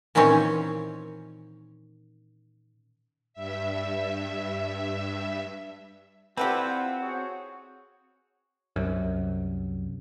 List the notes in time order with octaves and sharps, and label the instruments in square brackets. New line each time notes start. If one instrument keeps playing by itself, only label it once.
[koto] A#2 D#3 E3 C4 C#4 C#5
[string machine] G2 E5
[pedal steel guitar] C4 [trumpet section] E4 F4 D5 [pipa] G4 A4 B4 [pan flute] F#5
[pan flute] F#5
[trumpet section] F#4 G#4 C#5
[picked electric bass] C2 F#2